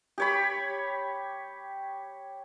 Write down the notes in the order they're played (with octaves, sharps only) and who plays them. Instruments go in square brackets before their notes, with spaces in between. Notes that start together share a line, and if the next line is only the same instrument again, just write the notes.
[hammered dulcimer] G4 C#5 B5